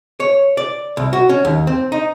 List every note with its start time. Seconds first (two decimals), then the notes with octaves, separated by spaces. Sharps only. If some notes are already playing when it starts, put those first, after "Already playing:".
0.20 C#5
0.57 D5
0.97 C2
1.13 F#4
1.29 C#4
1.45 D#2
1.67 C4
1.92 D#4